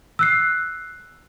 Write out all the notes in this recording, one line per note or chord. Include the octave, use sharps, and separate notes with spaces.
E6 F#6 C7